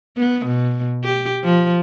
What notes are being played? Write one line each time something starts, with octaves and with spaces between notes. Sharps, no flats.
B3
B2
G4
F3